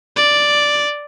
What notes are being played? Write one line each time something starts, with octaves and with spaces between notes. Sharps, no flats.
D5